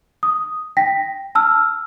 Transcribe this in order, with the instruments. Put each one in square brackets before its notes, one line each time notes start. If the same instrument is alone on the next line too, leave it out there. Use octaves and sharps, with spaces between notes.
[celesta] D#6
G5 A#6 B6
A5 E6 F6